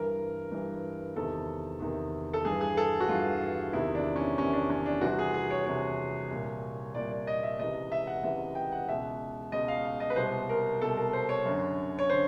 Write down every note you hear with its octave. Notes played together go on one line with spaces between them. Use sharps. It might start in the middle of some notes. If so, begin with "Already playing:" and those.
Already playing: G2 E3 A#4
G2 E3
E2 C3 D#3 A4
E2 C3 D#3
A4
G2 E3 G#4
G#4
A4
F#4
G2 E3 F4
E2 C3 D#3 E4
D4
C#4
E2 C3 D#3 C#4
D4
C#4
D4
C2 C3 E3 F#4
G#4
G#4
C#5
C2 C3 E3 C#5
C2 A#2
C2 A#2 D5
D5
D#5
E5
C#2 C3 E3 D#5
E5
F#5
C#2 C3 E3 E5
G5
F#5
C#2 B2 E5
C#2 B2 D#5
F5
F5
D#5
B4
C2 B2 C5
A#4
C2 B2 A4
A#4
C5
C#5
F#2 D3
C#5
D3 C5